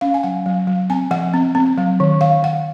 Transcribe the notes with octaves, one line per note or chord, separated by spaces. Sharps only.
C#4 F5
G#5
F#3 F#5
F#3
F#3
C4 G#5
F3 F#5
C4
C4
F#3
D#3
D#3 F5
D#3 F#5